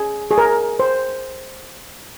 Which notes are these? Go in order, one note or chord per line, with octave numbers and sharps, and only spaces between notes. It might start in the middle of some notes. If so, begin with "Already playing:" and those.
Already playing: G#4
G#4
A#4
C5